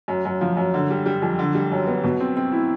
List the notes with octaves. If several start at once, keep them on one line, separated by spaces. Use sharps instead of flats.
F#2
F#2
F3
F#2
D3
G3
G3
F2
D3
G3
F#2
B3
B2
C4
C4
E4